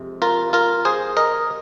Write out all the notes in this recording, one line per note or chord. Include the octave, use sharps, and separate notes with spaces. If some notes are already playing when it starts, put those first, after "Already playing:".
Already playing: F2 C3 G#3
F4 A#4
F4 A#4
G#4 C5
A#4 D#5